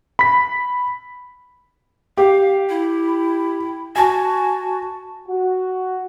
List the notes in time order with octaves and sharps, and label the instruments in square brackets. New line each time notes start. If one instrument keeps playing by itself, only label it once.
[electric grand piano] B5 B6
[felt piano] G4 [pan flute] F5
[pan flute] E4
[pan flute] F#4 [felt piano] G#5 A5
[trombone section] F#4